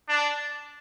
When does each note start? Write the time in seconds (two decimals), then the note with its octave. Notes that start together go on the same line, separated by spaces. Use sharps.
0.09 D4